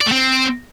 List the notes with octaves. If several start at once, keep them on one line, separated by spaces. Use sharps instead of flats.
D5
A3
C4